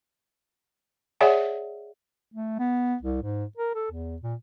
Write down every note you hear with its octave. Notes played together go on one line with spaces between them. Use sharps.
G#4 C#5 D5 E5 F#5 G#5
A3
B3
C2
G#2
A#4
A4
E2
A#2